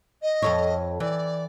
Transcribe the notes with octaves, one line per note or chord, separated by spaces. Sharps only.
D#5
F2 A4 C#5
E3 D5